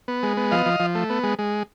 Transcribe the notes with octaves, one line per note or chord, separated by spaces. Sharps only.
B3
G#3
B3
F3 D#5 F5
F3
F3
A3
B3
G#3
G#3